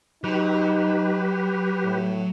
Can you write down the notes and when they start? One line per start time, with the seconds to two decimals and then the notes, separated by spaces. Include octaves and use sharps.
0.24 F#3 D#4 G4 B4
1.85 A2